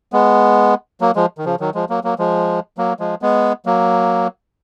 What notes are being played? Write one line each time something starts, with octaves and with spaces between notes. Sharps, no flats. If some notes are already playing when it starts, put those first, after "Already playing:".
G#3 B3
F#3 A#3
F3 G#3
D#3
C#3 F3
D#3 F#3
F3 G#3
F#3 A#3
F#3 A#3
F3 G#3
F#3 A#3
F3 G#3
G#3 B3
F#3 A#3